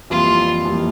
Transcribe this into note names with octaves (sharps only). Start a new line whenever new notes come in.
F2 E3 G3 A#3 E4 F4
F2 E3 G3 A#3 E4